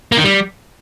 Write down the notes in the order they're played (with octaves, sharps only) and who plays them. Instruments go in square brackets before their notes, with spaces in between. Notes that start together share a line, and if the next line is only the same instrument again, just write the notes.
[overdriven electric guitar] A#3
D#3
G3